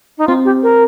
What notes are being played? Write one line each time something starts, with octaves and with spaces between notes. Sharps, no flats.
D#4
C4 F4
G4
A#4